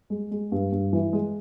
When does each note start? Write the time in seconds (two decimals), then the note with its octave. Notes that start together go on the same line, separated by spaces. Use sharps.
0.10 G#3
0.31 G#3
0.52 G2
0.72 G2
0.93 E3
1.13 G#3